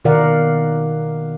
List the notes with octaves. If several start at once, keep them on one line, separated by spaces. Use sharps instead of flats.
B2 D#3 A#4 D5 F5 F#5